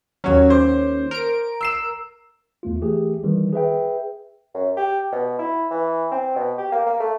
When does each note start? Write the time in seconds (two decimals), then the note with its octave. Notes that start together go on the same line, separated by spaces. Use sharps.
0.24 D#2 F#3 C#4 F#4 C#5
0.50 C5 D6
1.11 A#4 D7
1.61 E6 C7 E7
2.63 E2 A3 F4
2.81 E3 A3 G4 G#4
3.24 D#3 E3 G3
3.53 G#4 B4 E5 G5
4.54 F#2
4.77 G4
5.12 B2
5.39 E4
5.71 E3
6.11 C4
6.36 B2
6.58 G4
6.72 A#3
6.86 A#3
7.00 A3